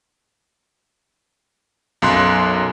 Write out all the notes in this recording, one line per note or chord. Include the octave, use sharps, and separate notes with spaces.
B1 F#2 C6 F#6